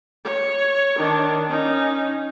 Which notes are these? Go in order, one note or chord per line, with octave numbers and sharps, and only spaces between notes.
C#5
D#3 D4
C#4 D#4